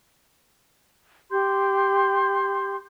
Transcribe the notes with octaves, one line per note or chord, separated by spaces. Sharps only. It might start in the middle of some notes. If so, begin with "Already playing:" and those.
G4 C6 G6